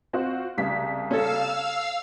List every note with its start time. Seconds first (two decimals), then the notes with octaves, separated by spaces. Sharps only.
0.13 C4 F4 F#4
0.58 C2 C#3 B6
1.11 C#4 A4 F5 E6